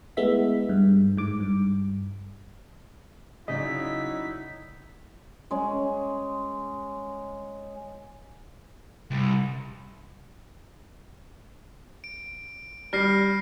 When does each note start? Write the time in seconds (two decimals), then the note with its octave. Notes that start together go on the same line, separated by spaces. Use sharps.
0.17 G#3 A3 B3 E4 E5 B6
0.69 G2
1.17 G#2 D6
1.40 G2
3.48 C#3 F#3 D#4 E4 D5 D#5 B6
5.51 G#3 C#4
9.11 C2
12.04 D7
12.93 G3 F6 A#6 C7